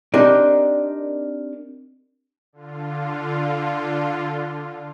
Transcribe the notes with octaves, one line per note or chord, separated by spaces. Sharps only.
C4 D4 D#4 G4 A#4 D5
D3 F4